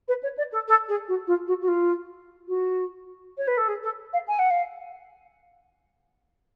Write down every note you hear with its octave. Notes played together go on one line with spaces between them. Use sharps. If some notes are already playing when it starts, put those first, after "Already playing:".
B4
C#5
D5
A4
A4
G#4
F#4
F4
F#4
F#4
F4
F#4
C#5
B4
A4
G#4
A4
F5
G#5
F#5
F5